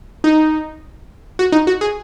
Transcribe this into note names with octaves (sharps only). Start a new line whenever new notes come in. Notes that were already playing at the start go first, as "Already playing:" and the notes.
D#4
F#4
D#4
F#4
G#4